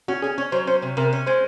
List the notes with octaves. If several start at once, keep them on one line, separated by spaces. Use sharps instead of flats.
C#4 F#4
C#4 G#4
C#4 C#5
F#3 C5
C#4 C5
C3
C3 A#4
C#4
G#3 C5